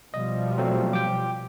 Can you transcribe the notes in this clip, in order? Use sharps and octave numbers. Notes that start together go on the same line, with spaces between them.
B2 F3 G3 D#5
F#3 A3 C4
G5 D6